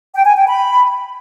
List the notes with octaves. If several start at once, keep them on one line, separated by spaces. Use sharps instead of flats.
G5
G#5
G5
B5